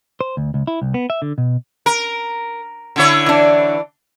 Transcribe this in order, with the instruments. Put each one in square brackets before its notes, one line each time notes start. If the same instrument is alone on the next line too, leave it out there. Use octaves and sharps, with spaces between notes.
[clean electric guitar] C5
D2
C#2
E4
C2
B3
E5
D3
B2
[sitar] A#4
D3 E4 C#5
[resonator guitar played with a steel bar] E3 D4